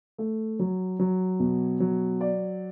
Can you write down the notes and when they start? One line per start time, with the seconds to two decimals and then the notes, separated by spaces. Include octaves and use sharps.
0.18 A3
0.59 F#3
0.99 F#3
1.40 B2
1.80 F#3
2.21 D5